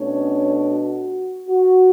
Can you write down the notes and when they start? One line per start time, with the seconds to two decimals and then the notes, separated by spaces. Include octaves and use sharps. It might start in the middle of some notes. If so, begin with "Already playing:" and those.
Already playing: B2 A3 C#4 D4 C#5
0.70 F#4
1.49 F#4